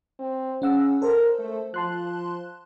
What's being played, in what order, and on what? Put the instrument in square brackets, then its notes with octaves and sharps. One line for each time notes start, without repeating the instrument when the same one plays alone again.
[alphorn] C4
[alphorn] C#3 [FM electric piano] C#4 F#5 E6
[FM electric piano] A4 C5 [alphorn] A#4
[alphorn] A3
[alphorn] F3 [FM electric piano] A5 C6 F#6